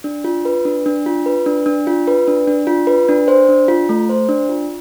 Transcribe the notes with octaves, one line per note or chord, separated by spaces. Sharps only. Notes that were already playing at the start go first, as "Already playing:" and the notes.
D4
F4
B4
D4
D4
F4
B4
D4
D4
F4
B4
D4
D4
F4
B4
D4
C5
D4
F4
A3
C5
D4
F4